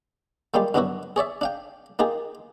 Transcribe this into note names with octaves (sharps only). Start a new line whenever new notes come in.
F3 G3 G#3 A#3 F4 G4
G2 F#3 B3 D4 E4 F#4
G#4 C#5 D5 E5
D4 F5 G5
A#3 D#4 F4 G4 G#4